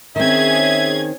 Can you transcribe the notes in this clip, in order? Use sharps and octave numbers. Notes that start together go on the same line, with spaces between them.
D#3 C4 C#4 G#4 E5 G#6